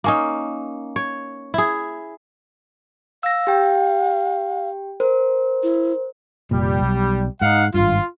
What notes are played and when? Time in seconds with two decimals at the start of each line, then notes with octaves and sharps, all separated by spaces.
0.04 A#3 C#4 D#4
0.96 C#5
1.54 E4 G#4
3.23 F5 E6 A#6
3.47 G4 G5
5.00 A#4 C5
5.63 E4
6.51 F1 A#2 G3
6.81 B1
7.42 G#2 D#4 F5 F#5
7.74 G#1 G2 F4